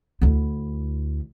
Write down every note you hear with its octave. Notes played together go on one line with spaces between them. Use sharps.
D2 E4